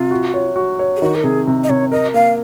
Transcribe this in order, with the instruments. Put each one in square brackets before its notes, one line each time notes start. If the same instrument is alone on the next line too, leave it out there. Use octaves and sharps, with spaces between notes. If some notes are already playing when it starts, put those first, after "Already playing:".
Already playing: [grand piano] C3 [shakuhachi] F4
[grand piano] F#4
C#5
F#4
C#5
[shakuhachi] G#4
[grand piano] D#3 [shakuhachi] F#4
[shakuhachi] A#4
[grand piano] C3 [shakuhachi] G#4
[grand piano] C3
[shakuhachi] D#5
[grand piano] C3 [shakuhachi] C#5
[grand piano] A#4 [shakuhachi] D#5
[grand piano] A#3 [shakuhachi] F5